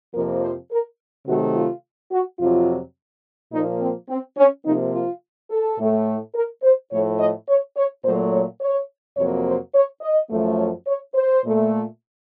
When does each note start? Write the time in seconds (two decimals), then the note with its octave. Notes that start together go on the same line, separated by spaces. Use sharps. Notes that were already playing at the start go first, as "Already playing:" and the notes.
0.13 F2 C3 F3 A#3 A#4
0.42 C5
0.71 A#4
1.26 C3 D#3 F#3 A3 F#4
1.55 F4
2.11 F#4
2.39 F2 C3 F#3 F4
3.52 A#2 F3 A#3 D#4
3.80 C4
4.09 C4
4.36 C#4
4.65 C3 F3 A#3 D#4
4.93 F4
5.50 A4
5.78 A2 A3
6.35 A#4
6.63 C5
6.91 A2 F3 A3 C#5
7.19 D#5
7.48 C#5
7.76 C#5
8.04 A#2 F#3 A3 C5
8.32 C#5
8.60 C#5
9.17 F2 C3 F#3 A#3 C#5
9.46 C5
9.74 C#5
10.01 D#5
10.30 F#2 F3 A3
10.58 C#5
10.86 C#5
11.14 C5
11.44 A#2 A3